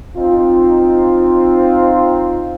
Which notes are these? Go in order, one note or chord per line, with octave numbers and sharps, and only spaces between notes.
C4 D#4 F4